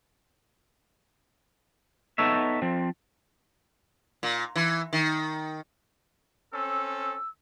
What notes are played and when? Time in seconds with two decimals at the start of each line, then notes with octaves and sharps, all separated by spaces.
2.18 B3 D#4 A4 C#5 E5
2.62 F3 C4
4.23 A#2
4.56 E3
4.93 D#3
6.53 C4 C#4 A4 E6